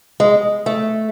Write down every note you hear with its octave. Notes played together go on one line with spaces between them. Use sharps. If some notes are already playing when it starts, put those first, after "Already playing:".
G#3
A3